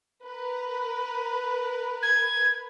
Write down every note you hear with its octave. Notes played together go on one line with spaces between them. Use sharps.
A#4 B4
G#6